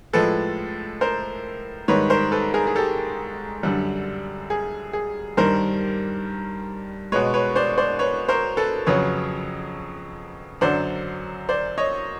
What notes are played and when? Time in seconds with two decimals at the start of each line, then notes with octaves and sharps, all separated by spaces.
0.13 A2 F3 G#3 A4 B4
1.01 A#4 C5
1.88 G#2 D#3 G3 B4 C#5
2.10 A#4 C5
2.32 A4 B4
2.54 G#4 A#4
2.67 G#4
2.76 G4 A4
3.63 F#2 D3 G3
4.50 G#4
4.93 G#4
5.37 G2 D#3 G3 A#4 C5
7.12 B2 G#3 B4 C#5
7.34 B4 C#5
7.56 C5 D5
7.78 C5 D5
7.99 B4 C#5
8.29 A#4 C5
8.57 A4 B4
8.87 F2 C#3 F#3 B4 C#5
10.61 F#2 D3 F#3 C5 D5
11.49 C5 D5
11.78 C#5 D#5